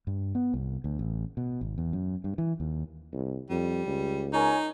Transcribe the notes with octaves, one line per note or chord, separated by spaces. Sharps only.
G2
B3
C2
D2
A1
B2
G#1
E2
F#2
G2
E3
D#2
C2
F2 G3
C#2
D#4 A#4 C#5 G#5